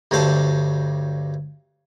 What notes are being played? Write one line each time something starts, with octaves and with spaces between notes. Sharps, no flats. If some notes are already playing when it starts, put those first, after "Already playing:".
D2 G2 F#3 C5 A5